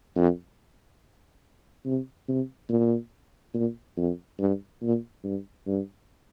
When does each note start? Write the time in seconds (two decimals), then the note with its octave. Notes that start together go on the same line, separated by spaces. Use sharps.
0.16 F2
1.85 C3
2.28 C3
2.69 A#2
3.54 A#2
3.97 F2
4.39 G2
4.82 A#2
5.24 G2
5.67 G2